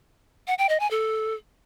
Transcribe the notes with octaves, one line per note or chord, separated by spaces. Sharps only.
F#5
G5
D#5
G#5
A4